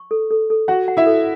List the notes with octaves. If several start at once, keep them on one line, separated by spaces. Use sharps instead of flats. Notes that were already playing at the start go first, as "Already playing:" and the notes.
Already playing: C#6
A4
A4
A4
F#4 F#5 C#6
F#5
E4 E5
A4